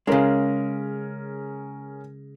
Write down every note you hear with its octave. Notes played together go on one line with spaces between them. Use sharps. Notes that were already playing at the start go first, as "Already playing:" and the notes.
C#3 G#3 C#4 G#4 A#4